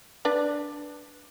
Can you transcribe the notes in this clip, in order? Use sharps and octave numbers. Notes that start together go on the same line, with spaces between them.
D4 B4 D5